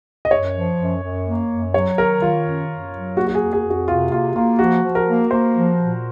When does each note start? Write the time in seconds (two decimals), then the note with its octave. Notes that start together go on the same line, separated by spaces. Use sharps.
0.25 D#5
0.31 F#2 C#5
0.55 F3
0.79 F#2
1.02 F#2
1.26 A#3
1.50 F#2
1.74 F#3 C#5
1.98 D#3 A#4
2.21 D#3 F4
2.45 F#2
2.69 F#2
2.93 F#3
3.16 A#3 F#4
3.27 F#4
3.35 G#4
3.40 F2
3.53 G#4
3.64 F2
3.70 F#4
3.88 C3 F4
4.12 A#3 F4
4.35 A#3 F4
4.59 F3 F#4
4.83 F3
4.95 A#4
5.07 A#3
5.30 A#3 C5
5.55 F3
5.78 A#2